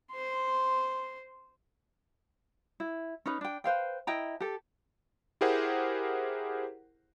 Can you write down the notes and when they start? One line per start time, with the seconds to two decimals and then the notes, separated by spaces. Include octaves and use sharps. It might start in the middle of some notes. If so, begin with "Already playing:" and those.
0.12 C5 C6
2.80 E4
3.26 C#4 D#4 B4
3.41 D4 G5
3.64 B4 C5 F5 G5
4.07 E4 D#5 G5 A#5
4.40 G4 A4
5.41 E4 G4 G#4 A#4 C5 F#5